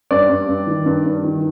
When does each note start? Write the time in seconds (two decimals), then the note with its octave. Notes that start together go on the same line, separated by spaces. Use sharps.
0.11 G2 D5
0.30 G2
0.49 G2
0.67 D#3
0.86 G2
1.05 G2
1.23 D#3